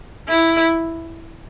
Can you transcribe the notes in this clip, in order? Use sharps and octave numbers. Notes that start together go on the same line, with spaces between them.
E4